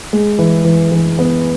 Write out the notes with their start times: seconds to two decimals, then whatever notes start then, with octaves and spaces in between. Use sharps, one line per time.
0.13 G#3
0.39 E3
0.65 E3
0.92 E3
1.19 B3